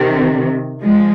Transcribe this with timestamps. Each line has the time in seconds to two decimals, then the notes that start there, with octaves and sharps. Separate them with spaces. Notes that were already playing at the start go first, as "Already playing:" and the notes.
Already playing: C3 D#3
0.83 F3 G#3